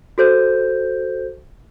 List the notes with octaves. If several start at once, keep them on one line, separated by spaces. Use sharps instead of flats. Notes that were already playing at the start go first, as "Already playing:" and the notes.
F#4 A4 C5 G6